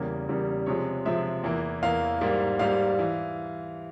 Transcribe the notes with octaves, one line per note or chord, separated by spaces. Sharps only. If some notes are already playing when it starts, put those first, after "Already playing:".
Already playing: E2 C#3 G3 A#3
E2 C#3 G3 A#3
C3 F3 G#3 C#5
C3 F3 G#3 E5
E2 E3 A#3
E2 E3 A#3 F5
G#2 G3 A#3
G#2 G3 A#3 F5
E3